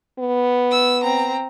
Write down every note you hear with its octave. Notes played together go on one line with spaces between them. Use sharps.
B3
E6
C4 A#5